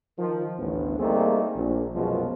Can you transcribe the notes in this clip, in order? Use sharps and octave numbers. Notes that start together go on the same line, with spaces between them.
D#3 F3
A1 D2 B3
G3 A3 A#3 C4 D#4 G#4
A#1
C2 F#2 B2 F3 G#3